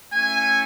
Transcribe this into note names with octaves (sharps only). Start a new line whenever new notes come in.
A3 C#4 E4 G#5